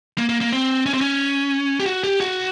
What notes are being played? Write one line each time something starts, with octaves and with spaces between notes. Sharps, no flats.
A#3
A#3
A#3
C4
C#4
C4
C#4
G4
F#4
G4
F#4